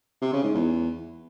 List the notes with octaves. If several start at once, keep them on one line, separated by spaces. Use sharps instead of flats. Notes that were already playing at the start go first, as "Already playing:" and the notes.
C3
C#3
G#2
E2